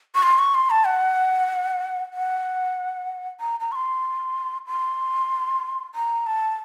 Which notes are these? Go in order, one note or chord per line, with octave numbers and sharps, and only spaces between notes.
C#6
C6
C#6
C6
A5
F#5
F#5
A#5
A#5
C#6
C6
C6
A#5
A5